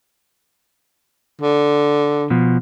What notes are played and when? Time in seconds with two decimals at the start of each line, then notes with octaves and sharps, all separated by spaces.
1.41 D3
2.30 B2 F3